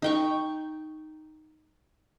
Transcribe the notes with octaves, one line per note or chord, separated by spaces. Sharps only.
D#4 G5 C#6